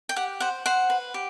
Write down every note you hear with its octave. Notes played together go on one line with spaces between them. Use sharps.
G5
G4 F#5
C5 F#5
C5 F#5
B4
G4